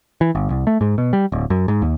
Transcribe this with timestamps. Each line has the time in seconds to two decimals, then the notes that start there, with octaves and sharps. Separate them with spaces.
0.21 E3
0.35 G1
0.50 C2
0.67 A3
0.81 G#2
0.98 B2
1.13 G3
1.32 D1
1.50 F#2
1.68 G#2
1.82 D#2